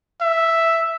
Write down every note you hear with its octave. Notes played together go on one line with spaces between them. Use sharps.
E5